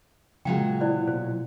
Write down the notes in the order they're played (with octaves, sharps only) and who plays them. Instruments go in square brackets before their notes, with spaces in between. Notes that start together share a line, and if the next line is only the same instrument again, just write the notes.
[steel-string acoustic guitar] A#2 F#3 G#3 [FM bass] C#3 [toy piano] G5
[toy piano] E4 C5 D5
[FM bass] B2 [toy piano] C5